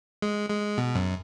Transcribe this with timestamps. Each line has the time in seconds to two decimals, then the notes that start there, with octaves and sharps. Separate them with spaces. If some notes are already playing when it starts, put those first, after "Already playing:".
0.22 G#3
0.50 G#3
0.78 B2
0.95 F#2